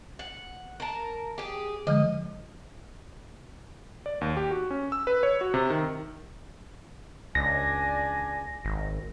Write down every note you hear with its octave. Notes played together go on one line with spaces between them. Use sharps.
F#5
A#4 A5
G4 G#4
D3 F3 G#3 D#5
D5
D#2
G4
F#4
C#4
E6
B4
C#5
F#4
C3
D#3
C#2 D4 D5 G#5 A#6
G#1